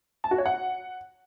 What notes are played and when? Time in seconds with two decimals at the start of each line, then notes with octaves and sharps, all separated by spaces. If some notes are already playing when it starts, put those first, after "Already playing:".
0.24 A5
0.31 F#4
0.38 C#5
0.46 F#5